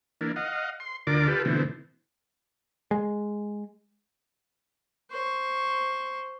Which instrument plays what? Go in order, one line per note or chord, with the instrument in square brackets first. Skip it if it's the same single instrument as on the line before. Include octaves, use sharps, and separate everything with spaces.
[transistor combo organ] E3 A#3 D4
D#5 F5 F#5
C6
D2 D3 F4 A#4 D5 D6
F4 G4 A4 B4
B2 D3 E3 A3 C4
[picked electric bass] G#3
[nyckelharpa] C5 C#6